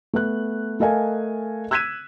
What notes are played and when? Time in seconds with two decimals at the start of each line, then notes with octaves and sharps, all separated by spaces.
0.14 A3 B3 F#6
0.80 A3 A4 A#4 D#5 F5 G#5
1.71 E6 F#6 G#6 B6 D#7 E7